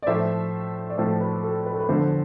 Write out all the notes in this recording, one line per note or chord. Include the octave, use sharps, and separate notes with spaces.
D5
A2 F3 A3 C5 E5
D5
A2 F3 A3 A4 C5
B4
A4
B4
A4
B4
E2 D3 F3 A4 C5